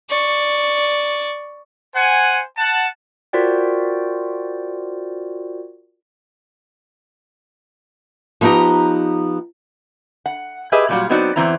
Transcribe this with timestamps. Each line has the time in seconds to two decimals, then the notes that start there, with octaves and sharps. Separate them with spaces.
0.10 D5 C#6
1.94 C5 F#5 G#5
2.57 F#5 A5
3.33 F4 F#4 A#4 C5 D5 G5
8.41 F3 B3 D#4 G4 A#5
10.26 F#5
10.72 G4 G#4 B4 D#5 E5
10.89 A#2 F#3 G3 C#4 F4 F#4
11.10 F#3 B3 C4 D#4 F#4 D5
11.36 E2 E3 C4 E4 A#5